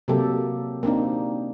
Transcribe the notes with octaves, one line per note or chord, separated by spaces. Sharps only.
C3 F#3 A#3 G4 A4
A#3 C4 D4 D#4